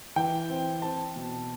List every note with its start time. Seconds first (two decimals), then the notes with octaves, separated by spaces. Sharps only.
0.16 E3 G5
0.50 C4
0.82 C4 A5
1.16 B2